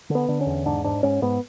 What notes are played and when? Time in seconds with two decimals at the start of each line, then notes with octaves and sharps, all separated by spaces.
0.10 D3
0.15 B3
0.29 D3
0.41 C#4
0.47 E2
0.66 G#2 D4
0.84 G#2 D4
1.03 G#2 C#4
1.22 G#2 B3